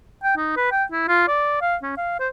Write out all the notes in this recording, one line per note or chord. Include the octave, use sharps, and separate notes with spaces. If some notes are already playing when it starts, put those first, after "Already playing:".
G5
D#4
B4
G5
E4
F4
D5
F5
C#4
F5
C5